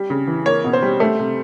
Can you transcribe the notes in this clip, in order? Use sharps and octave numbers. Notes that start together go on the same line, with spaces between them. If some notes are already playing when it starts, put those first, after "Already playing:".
Already playing: G3
C#3
E3
A#3 C#5
B2
C5
G3
A3
C3